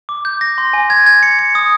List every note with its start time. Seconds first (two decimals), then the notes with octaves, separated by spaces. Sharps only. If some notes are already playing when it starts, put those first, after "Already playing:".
0.09 D6
0.25 G6
0.41 A#6
0.58 C6
0.73 G#5
0.90 G#6
1.06 G#6
1.23 C#7
1.39 C#7
1.55 D#6